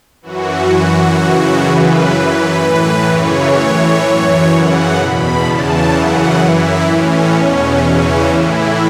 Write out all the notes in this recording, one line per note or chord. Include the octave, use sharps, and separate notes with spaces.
F#2 E3 F#4
F#2 E3
F#2 C#3 E3
F#2 C#3 E3 B4
F#2 E3
A2 E3 B4
F#2 C#3 E3 C#5
A2 E3 C#5
F#2 E3
F#2 C#3 E3 F#5
E2 B2 B5
E2 C#3 E3 A5
F#2 C#3 E3 F#5
F#2 E3 E4
A2 E3 C#4
E2 B2 C#4
E2 C#3 E3
A2 E3 E4